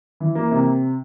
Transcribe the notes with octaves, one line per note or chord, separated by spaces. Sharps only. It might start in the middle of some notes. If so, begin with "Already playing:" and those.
E3
A#3
C3